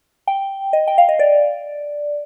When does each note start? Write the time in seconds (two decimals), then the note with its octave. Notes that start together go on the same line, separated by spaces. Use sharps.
0.28 G5
0.73 D#5
0.88 G5
0.98 F5
1.09 D#5
1.19 D5